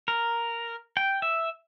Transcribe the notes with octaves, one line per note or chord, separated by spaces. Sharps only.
A#4
G5
E5